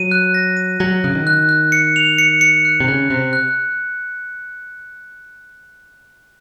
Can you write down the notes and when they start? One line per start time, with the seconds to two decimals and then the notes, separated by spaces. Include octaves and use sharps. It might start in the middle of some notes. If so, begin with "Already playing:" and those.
Already playing: F#3 D#7
0.11 F#6
0.34 A#6
0.57 D#7
0.80 F#3 A#6
1.04 C#3 F#6
1.15 D#3
1.27 F#6
1.49 F#6
1.72 C#7
1.96 F7
2.18 C#7
2.41 C#7
2.65 F#6
2.80 C3
2.88 C#3 F#6
3.10 C3 F#6
3.33 F#6